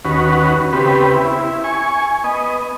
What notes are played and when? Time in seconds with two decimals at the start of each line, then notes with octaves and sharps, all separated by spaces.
0.05 D#2 C#4 F#4 B4
0.73 C#3 B3 C4 G4 B4
1.12 E4
1.64 G#5 C#6
2.24 B3 D#5